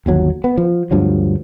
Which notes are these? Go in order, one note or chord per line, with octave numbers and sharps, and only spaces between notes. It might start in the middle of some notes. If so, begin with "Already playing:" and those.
G1 D#2 F#3
B3
F3
D2 G2 F3 F#3